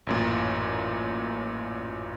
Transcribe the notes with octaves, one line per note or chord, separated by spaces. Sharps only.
A1 F#2 A#2